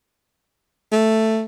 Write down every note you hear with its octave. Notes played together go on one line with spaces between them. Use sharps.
A3